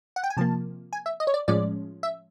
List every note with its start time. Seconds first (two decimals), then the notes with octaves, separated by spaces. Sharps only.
0.16 F#5
0.24 G5
0.30 G#5
0.37 C3 F3 A#3 A5
0.93 G#5
1.06 E5
1.20 D#5
1.27 C#5
1.34 D5
1.48 A2 F3 G#3 C#4 D5
2.03 E5